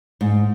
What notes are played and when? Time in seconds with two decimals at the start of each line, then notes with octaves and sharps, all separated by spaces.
0.21 G#2